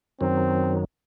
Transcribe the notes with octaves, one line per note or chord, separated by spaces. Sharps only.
F#2 D#3 F#3 C4